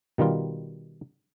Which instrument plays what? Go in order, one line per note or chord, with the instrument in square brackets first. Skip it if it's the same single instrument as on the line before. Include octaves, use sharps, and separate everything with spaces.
[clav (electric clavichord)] B2 D#3 G3 F4